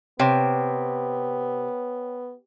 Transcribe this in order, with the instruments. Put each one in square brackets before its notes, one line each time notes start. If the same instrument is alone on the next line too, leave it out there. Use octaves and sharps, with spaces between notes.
[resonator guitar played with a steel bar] C3 [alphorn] B3 [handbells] C#5 G5